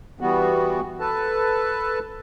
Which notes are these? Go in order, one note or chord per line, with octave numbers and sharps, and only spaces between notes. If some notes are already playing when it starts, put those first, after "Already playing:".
E3 G3 B3 F#4
A4 B4 A5